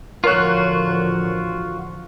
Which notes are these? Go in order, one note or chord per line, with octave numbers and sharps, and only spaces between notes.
A1 D3 F3 F4 F#4 A#4 C#5 F#6